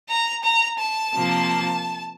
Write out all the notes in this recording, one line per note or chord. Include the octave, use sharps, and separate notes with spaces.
A#5
A#5
A5
C3 F3 A#3